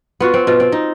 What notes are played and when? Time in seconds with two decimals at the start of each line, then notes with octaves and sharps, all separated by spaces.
0.20 B3 F4 F#4
0.34 C4
0.47 B2 F4
0.60 C4
0.72 D#4